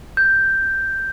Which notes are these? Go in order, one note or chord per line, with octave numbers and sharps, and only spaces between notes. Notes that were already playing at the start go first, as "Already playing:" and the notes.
G6